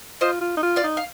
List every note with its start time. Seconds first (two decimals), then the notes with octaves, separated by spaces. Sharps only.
0.21 F4 C5 D#5
0.41 F4
0.57 D#4
0.63 F4
0.76 D5 F5
0.84 D#4
0.97 F5